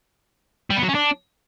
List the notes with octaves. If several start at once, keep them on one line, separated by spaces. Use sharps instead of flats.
G3
B3
F#3
C#4
D4